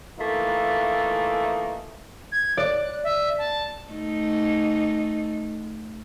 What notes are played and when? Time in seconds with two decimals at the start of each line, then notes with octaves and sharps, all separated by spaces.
0.20 E3 A3 A#3 D#4 F4
2.32 G#6
2.57 D5 F#6
3.03 E5
3.38 A5
3.91 A3 D#4